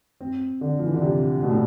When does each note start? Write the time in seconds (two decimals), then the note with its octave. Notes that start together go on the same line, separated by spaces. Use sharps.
0.21 C4
0.61 D3
0.79 F3
0.87 E3
0.94 D3
1.02 C3
1.43 B2
1.50 A2